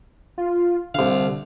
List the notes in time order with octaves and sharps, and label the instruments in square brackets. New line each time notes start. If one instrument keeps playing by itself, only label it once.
[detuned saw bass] F4
[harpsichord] C2 F5 [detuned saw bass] D3